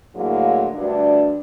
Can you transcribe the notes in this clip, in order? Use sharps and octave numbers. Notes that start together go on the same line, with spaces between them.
A2 D3 F#3 G#3 A#3
D2 G2 D4